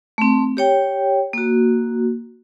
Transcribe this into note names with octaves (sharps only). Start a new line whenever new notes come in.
A3 C4
G4 C#5 G5
A#3 F#4